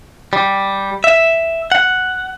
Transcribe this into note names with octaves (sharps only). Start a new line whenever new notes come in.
G3
E5
F#5